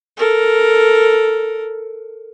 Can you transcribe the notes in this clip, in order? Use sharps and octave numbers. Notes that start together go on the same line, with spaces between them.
A4 A#4